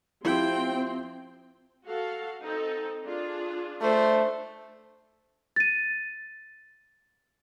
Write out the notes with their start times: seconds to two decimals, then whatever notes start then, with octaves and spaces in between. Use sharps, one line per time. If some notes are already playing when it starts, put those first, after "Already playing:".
0.25 F3 C4 E4 G4 G5 C6
1.85 F#4 A4 F5
2.42 C4 D#4 A4
3.05 D4 F4 G#4
3.81 A3 D4 C5
5.56 A6 D#7